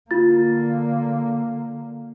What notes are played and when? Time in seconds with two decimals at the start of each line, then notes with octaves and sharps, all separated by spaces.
0.11 D3 A#3 F4 A6